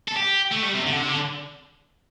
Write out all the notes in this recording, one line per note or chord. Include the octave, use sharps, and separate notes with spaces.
A4
G4
A3
G3
C3
D3
C3
D3